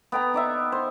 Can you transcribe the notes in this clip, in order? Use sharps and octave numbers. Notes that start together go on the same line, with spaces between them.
B3 G5 A#5
D#4 D5 E5
C5